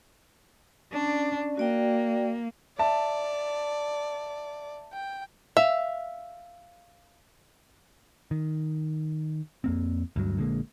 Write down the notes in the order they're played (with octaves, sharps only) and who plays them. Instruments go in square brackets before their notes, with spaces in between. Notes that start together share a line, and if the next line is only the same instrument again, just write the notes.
[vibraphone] C#4 D5 [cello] D4
[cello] A#3 [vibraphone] F#4 D5 G5
[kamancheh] D5 [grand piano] E5 A5
[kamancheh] G5
[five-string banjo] E5 [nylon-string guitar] F5
[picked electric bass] D#3
F2 A#3 C4
D2 G2 F#3
A#1 D3 G#3 A#3